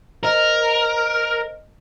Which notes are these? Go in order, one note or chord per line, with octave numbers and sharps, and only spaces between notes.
A#4 C5 D#5